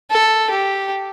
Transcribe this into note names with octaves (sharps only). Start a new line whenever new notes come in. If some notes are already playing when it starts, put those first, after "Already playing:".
A4
G4